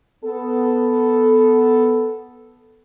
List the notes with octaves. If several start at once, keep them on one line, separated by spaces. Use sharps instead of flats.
B3 A4